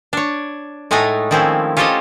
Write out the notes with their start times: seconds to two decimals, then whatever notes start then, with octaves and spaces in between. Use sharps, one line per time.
0.13 D4 C#5
0.91 A2 G#3 A3 D#4 G#5 A#5
1.31 D#3 F3 C4 C#4 E4
1.77 C#4 F4 G4 A4 C5 D#5